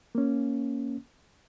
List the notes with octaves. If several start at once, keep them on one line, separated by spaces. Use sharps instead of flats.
A#3 C#4